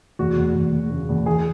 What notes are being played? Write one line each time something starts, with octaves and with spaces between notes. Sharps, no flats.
E2 F#4
E2
E2
E2
C#3
E2
E3 G#4